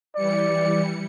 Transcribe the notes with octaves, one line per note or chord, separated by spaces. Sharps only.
E3 G3 D5 C#7